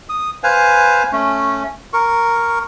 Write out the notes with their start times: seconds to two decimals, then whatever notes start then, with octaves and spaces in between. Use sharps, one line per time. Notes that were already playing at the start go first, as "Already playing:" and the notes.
0.09 D#6
0.44 B4 C5 F5 G#5
1.12 A3 C#4
1.93 A#4 C#6